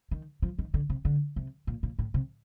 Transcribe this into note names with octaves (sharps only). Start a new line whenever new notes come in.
D#3
F3
D#3
D3
C3
D3
C3
A#2
A#2
A2
C3